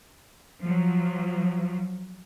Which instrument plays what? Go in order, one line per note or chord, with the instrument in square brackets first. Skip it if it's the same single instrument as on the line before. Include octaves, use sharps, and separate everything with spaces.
[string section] F3 F#3